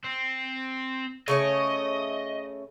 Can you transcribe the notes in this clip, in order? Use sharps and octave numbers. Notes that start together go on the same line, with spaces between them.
C4
C#3 A3 C#5 D#5